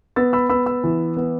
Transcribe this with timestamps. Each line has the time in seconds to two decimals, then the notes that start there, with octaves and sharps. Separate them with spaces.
0.16 B3 E6 A6
0.33 B5 E6
0.49 B3 B5 E6
0.66 B5 E6
0.84 E3
1.17 B3